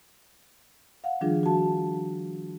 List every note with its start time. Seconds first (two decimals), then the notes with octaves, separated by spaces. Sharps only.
1.04 F5 F#5
1.21 D#3 F3 G3 D4 F4 G#4
1.43 F#4 A5